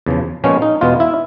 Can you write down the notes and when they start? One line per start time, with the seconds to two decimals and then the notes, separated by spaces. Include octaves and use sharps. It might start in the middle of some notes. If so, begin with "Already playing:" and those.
0.06 E2 C#3 F3
0.44 A#2 F3 G#3 B3 C#4
0.62 D#4
0.81 E2 B2 G#3 B3 F4
1.00 E4